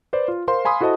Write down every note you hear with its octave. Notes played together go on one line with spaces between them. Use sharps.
B4 C5 D5
F4
A#4 C5 F5 C6
F5 G#5 B5 C6 D#6
E4 F#4 A4 C5 D#5 A5